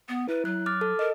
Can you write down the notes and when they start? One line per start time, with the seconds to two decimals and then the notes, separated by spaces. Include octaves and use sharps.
0.09 B3
0.29 E4 B4
0.45 F#3 F#6
0.66 D6 F6 A6
0.81 A4
0.99 A#4 D#5